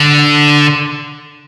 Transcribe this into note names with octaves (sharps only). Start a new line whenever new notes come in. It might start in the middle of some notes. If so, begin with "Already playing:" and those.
Already playing: D3